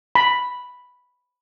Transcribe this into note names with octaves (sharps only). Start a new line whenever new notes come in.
B5